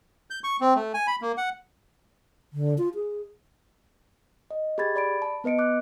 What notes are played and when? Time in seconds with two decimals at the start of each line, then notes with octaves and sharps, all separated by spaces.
0.30 G6
0.44 C#6
0.61 C4
0.76 A3
0.94 G#5
1.07 B5
1.21 A#3
1.38 F#5
2.53 D3
2.78 F4
2.95 G#4
4.51 D#5
4.78 G4 G#4 B5 G#6 A6
4.96 D5 B5 D7
5.22 A5
5.44 B3 B4 D#5 C#7 D7
5.59 D6 F#6